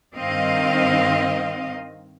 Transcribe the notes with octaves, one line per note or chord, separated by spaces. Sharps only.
G2 D#3 C4 D#5 F5